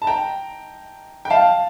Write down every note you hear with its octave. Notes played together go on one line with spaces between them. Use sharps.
A5
G5 A#5
G5
F5 A5